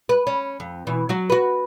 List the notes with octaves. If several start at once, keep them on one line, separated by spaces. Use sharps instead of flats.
B4
C#4
F2
B2 E3
F#3 F#4
F#4 B4